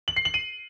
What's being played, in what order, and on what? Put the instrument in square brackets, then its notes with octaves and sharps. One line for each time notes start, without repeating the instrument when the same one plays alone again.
[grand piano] F#7
C7
F#7
D#7